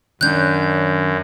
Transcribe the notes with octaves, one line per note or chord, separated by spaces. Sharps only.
F#2 D#3 C#4 D4 F#6 G6